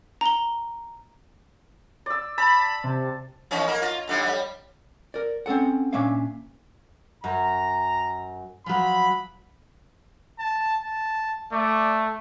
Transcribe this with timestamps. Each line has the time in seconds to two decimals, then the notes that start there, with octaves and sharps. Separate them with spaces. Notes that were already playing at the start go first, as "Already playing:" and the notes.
0.21 A#5 G7
2.06 D5 E6
2.38 A5 B5
2.84 C3
3.51 D#3 E3 C#4
3.68 A#3 A#4
3.82 F4
4.08 D#2 D3 G3
4.26 G3
5.14 A#4 D5
5.46 C4 C#4 A4 F#5
5.93 A#2 A#3 C#4 D4 E5 F5
7.24 F#2 A#5
8.66 F3 F#3 B5
10.39 A5
10.80 A5
11.52 A3 D5